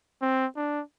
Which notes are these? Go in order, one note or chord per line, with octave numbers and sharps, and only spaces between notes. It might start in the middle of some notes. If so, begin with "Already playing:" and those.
C4
D4